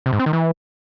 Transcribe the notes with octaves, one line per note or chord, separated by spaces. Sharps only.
C3
G#2
C4
D#3
E3